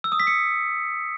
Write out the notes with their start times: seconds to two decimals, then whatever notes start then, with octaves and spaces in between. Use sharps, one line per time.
0.04 E6
0.12 D#6
0.20 B6
0.27 C#7